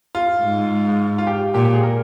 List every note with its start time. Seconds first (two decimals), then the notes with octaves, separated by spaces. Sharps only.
0.15 F4
0.42 G#2
1.18 F4
1.27 G4
1.54 A#2 G4
1.65 G4
1.74 G#4
1.83 A#4